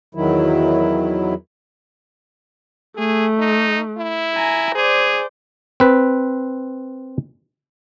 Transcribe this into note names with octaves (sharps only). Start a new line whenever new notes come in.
E2 D#3 F#3 E4
A3 G#4
D#4
E4
G#5 A#5
G#4 C5 D5
C4 B4